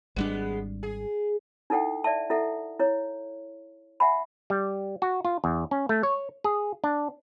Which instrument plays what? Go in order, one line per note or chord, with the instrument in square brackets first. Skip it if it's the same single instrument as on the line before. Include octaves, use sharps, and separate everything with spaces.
[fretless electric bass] G#1 G3 D4 [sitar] G#3 B3
[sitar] G#4
[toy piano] D#4 E4 A4 F#5 G5
D5 E5 A5
E4 A4 E5 F#5
E4 C#5
E5 F#5 G#5 B5
[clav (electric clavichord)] G3
F#4
F4
E2
C#4
A3
C#5
G#4
D4